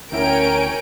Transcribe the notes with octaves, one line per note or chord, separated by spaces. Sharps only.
D2 C#4 E4 A#4 G5 G#5 D7